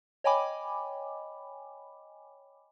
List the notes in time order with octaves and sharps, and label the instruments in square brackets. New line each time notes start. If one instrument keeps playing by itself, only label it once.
[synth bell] C#5 D#5 G5 G#5 B5 D6